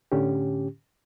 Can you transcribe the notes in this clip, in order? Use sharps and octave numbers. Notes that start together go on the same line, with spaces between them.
A2 D3 C#4 G4